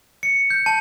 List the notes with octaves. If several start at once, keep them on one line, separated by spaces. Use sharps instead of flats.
C#7
G6
A5